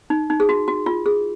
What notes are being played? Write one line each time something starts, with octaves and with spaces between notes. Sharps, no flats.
D#4
D#4
G#4
F#4
F#4
F4
G#4